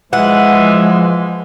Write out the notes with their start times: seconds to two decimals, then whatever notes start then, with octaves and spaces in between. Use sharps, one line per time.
0.13 E3 F3 G#3 F#5